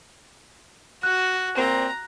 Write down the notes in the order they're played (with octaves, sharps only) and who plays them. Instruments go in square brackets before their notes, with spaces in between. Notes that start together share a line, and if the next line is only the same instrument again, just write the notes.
[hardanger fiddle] F#4 [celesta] F#6
[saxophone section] A#2 C4 [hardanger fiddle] A#5